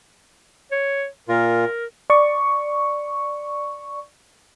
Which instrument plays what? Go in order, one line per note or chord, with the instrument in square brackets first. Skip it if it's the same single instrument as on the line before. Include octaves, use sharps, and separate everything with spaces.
[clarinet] C#5
[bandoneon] A#2 F4 [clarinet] A#4
[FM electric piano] D5 C#6